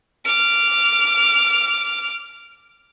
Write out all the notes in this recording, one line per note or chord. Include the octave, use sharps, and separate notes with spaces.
D6 F6